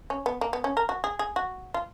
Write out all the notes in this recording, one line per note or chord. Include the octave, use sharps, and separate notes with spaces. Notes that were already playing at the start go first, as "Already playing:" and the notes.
C#4
B3
A#3
B3
C#4
A#4
F#4
G#4
G#4
F#4
F4